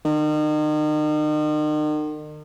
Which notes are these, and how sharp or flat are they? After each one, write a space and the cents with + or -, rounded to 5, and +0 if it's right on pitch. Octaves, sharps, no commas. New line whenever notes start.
D#3 -40